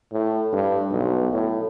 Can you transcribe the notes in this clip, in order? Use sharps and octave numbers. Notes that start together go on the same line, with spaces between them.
A2
G2
B1
A2